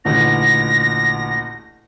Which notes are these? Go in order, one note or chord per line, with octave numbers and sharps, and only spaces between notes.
A1 D2 A#2 A#6